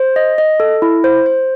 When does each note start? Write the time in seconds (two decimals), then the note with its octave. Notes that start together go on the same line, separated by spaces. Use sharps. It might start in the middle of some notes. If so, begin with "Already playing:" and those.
Already playing: C5
0.16 D#5
0.38 D#5
0.60 A4
0.82 E4
1.04 C5
1.26 C5